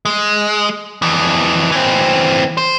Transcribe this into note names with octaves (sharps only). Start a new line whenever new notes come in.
G#3
F2 E3
E3 C4
C5